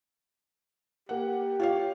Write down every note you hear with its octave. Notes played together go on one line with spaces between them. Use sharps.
A#3 G4 F#5
F4 C#5 F5